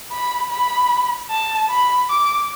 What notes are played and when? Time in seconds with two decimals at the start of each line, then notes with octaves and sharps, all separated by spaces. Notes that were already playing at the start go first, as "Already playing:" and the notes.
0.12 B5
0.51 B5
1.30 A5
1.71 B5
2.10 D6